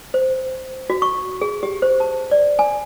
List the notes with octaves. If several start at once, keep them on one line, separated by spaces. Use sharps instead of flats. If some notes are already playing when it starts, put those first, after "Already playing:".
C5
F#4
C#6
G#4
G4
C5
A5
D5
G#5